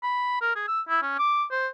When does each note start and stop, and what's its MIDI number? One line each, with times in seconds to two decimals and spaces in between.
0.03 0.39 83
0.41 0.53 70
0.56 0.63 68
0.68 0.81 88
0.89 1.01 64
1.02 1.15 61
1.19 1.45 86
1.52 1.67 72